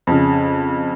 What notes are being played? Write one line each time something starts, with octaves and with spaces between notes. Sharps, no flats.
F2 C#3